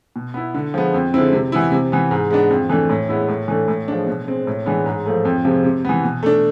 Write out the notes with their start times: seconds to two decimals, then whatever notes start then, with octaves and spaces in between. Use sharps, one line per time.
0.16 B2
0.34 B3 E4
0.54 D3
0.74 F3 G#3 B3
0.94 F2
1.14 D3 G#3 C4 E4
1.33 C3
1.52 E3 B3 E4
1.72 C3
1.92 E3 B3
2.11 G#2
2.30 G#3 B3 D4
2.51 F2
2.69 E3 A3 D4
2.89 A2
3.09 G#3 B3 E4
3.28 A2
3.48 E3 A3 D4
3.68 A2
3.88 F3 G#3 D4
4.07 B2
4.27 G#3 C4
4.47 A2
4.66 E3 G#3 B3 D4
4.86 G#2
5.06 F3 A3
5.25 F2
5.45 C3 F3 G#3
5.64 C3
5.85 E3 B3
6.04 B2
6.23 A3 D4